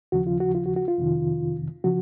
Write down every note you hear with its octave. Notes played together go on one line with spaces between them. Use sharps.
D#2 C#3 F3 F#4
F4
F#4
F4
F#4
F#4
F4
F2 C3 D#3
C#3 F3 F#4